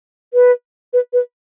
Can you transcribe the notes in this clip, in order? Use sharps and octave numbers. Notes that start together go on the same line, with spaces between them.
B4
B4
B4